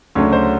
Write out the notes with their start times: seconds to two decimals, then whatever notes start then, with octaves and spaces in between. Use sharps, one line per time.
0.15 D2 C#3 F#3 A3 D4 C#5
0.33 C5